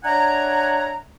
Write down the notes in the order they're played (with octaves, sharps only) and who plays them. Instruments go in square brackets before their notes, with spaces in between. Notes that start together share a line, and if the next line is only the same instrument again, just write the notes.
[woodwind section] D4 C#5 E5 F#5 G#5 A#5